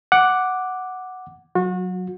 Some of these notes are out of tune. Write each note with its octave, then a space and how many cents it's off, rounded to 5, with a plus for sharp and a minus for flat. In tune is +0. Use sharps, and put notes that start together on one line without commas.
F#5 +0 D6 +0
F#3 -5 F#4 -35